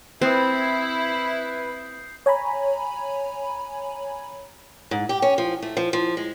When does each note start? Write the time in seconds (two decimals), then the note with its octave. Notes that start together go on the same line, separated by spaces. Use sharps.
0.21 C4 E4 B4 D#6 G6 C7
2.26 C#5 G#5 A#5 B5
4.91 G#2
5.09 G4
5.22 C#4
5.38 F3
5.62 A3
5.77 F3
5.93 F3
6.17 G#3